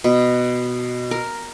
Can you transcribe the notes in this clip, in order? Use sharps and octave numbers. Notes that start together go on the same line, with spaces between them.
B2
A#4